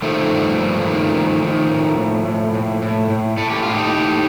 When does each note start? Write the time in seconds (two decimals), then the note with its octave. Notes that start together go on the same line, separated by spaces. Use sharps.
0.02 D#3 F3 A3
0.30 G2
0.59 G2
0.86 D#3
1.14 D#3
1.42 D#3
1.70 A2
1.97 A2
2.25 A2
2.54 A2
2.82 A2
3.10 A2
3.37 A2 A4
3.50 G4
3.63 A2 F4
3.74 D#4 G4
3.93 A2